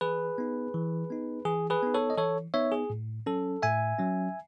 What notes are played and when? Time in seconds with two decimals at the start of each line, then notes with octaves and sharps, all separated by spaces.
0.01 E3 G#4 B4
0.38 B3 D#4
0.74 E3
1.10 B3 D#4
1.45 E3 G#4
1.70 G#4 B4
1.83 B3 D#4
1.94 A4 C#5
2.10 D#5
2.17 E3 A4 C#5
2.54 B3 D#4 C#5 E5
2.72 G#4
2.90 A2
3.26 F#3 C#4 A4
3.62 A2 E5 G#5
3.99 F#3 C#4